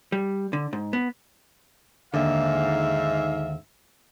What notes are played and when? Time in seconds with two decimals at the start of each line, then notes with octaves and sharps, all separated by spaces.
0.12 G3
0.53 D3
0.73 G#2
0.93 B3
2.14 D#2 G#2 D3 E5 F5